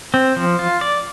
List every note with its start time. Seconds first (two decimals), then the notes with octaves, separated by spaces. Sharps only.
0.14 C4
0.36 F3
0.59 F4
0.81 D5